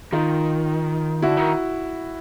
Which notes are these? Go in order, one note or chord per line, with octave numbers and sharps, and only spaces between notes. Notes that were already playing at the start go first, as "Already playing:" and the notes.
D#3 D#4 F4
D3 E4 F#4
D#3